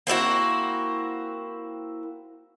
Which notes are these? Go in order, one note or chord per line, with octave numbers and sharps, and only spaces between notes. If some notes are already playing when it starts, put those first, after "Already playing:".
A#3 C4 E4 F#4